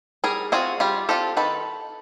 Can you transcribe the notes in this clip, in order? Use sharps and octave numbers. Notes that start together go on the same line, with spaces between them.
G3 G#4 A#4
C4 F4 F#4 G#4
G3 F4 G4
C4 F4 G4 A4
D#3 A4 B4